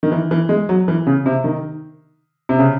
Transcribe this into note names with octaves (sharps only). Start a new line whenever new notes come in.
D#3
E3
E3
G#3
F#3
E3
C#3
C3
D#3
C3
C#3